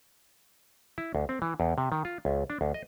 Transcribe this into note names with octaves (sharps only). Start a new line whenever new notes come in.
E4
D2
C4
E3
E2
C3
D#3
F4
C#2
D4
D2
D#5